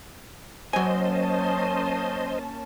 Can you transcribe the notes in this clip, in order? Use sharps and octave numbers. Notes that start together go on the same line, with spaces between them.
F#3 A#3 C#4 C5 D#5 G#5 A5